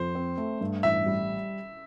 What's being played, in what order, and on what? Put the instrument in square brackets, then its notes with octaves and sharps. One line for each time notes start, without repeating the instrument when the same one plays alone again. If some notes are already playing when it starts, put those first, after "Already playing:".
Already playing: [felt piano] F2 [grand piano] C5
[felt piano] C4
A3
G2
[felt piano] A1 [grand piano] E5
[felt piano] G3